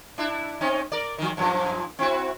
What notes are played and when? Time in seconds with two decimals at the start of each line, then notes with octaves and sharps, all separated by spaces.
0.18 D4 E4
0.61 C4 C#4 D#4
0.92 A#4 D5
1.18 D#3 F3
1.37 F#2 A#2 F3
1.99 C4 E4 F#4